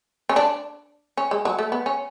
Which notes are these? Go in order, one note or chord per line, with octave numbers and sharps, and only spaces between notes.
C#4
D4
C#4
G#3
F#3
A3
B3
C#4